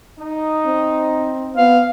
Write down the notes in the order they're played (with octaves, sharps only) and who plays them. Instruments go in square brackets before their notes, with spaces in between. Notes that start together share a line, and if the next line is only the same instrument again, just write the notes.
[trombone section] D#4
[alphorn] C4
[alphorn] B3 [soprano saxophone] F5